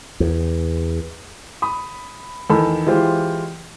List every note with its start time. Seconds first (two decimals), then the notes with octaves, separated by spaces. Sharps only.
0.20 E2
1.62 B5 D#6
2.50 E2 D#3 A4 A5 B5
2.86 E3 G#3 E4 F4 G4 C5